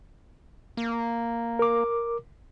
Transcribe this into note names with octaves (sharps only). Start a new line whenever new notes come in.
A#3
A#4 D6